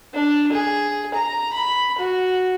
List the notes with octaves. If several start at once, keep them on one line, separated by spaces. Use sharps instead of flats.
D4
G#4
A#5
B5
F#4